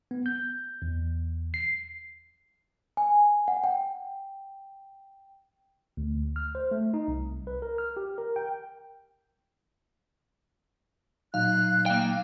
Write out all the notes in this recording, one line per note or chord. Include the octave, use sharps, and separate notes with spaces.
B3
G6
E2
C7
G#5
F#5
G5
D2
F6
C5
A3
D#4
C2
B4
A#4
F6
G4
A#4
G5
A#2 F#3 D#4 F5 F#6
A#3 F5 G5